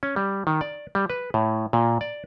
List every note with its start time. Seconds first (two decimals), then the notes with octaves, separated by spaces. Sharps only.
0.03 C#4
0.16 G3
0.47 D#3
0.61 D5
0.95 G3
1.10 B4
1.34 A2
1.73 A#2
2.01 D5